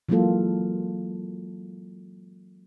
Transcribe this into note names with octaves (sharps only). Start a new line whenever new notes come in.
E3 F#3 G#3 A#3 F4 A4